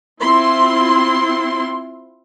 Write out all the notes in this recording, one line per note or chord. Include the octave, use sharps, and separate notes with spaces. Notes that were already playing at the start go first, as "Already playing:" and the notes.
C4 E4 F4 C6